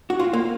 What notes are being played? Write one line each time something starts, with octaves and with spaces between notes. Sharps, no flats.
F#4
F4
A#3